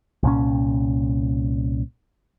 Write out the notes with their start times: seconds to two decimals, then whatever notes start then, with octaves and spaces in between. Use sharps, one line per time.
0.23 C2 A#2 C#4